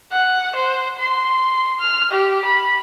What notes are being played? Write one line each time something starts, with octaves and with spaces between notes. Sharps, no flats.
F#5
C5
C6
F6
G4
B5